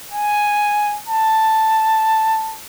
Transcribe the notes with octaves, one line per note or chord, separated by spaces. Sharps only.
G#5
A5